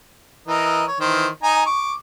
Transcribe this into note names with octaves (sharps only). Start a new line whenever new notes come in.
E3 A#4 D#5
C#5
D#3 E3 C5
D#4 G#5 A#5
C#6 D6